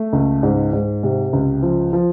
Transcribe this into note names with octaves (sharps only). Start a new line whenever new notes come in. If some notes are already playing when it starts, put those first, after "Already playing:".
Already playing: A3
C#2
G#2
G#2
C3
C#2
F3
F3